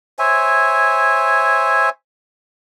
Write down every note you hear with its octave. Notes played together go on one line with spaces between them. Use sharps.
C5 C#5 E5 G#5